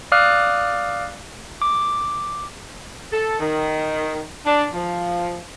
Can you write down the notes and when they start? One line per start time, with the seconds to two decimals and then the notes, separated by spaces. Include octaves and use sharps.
0.12 D5 F5 D6 D#6 F6 F#6
1.61 D6
3.11 A4
3.40 D#3
4.46 D4
4.73 F3